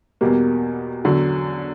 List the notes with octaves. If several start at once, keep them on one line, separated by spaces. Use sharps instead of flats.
E2 B2 G3 A#3
E2 D3 F#3